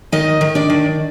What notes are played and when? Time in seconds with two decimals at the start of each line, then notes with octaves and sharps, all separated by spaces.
0.12 D#3 D#4 D#5
0.41 D#3
0.55 D4 D5
0.70 D#3